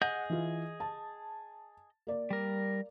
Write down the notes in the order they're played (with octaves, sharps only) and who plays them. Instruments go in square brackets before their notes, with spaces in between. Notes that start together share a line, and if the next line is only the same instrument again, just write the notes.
[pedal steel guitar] G#4 D#5 G6 [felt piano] F#5
[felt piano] E3 F4
A5
A#3 D5
[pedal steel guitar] G3 A#4